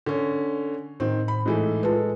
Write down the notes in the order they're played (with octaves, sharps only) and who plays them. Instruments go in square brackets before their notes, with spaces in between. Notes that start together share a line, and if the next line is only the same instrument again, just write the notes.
[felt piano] D3 C#4
[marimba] A2 [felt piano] D#3 C4
[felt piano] B5
G#2 E3 A3
[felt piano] G#3 A4 [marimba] F4 B4